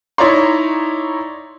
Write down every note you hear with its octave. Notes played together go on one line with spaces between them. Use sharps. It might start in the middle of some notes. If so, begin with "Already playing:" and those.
D#4 E4 C#5 D5 A#5 C6